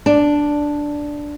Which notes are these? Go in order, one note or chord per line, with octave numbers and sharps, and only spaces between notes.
D4